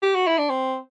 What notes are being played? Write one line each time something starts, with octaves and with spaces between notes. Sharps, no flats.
G4
F#4
E4
D4
C4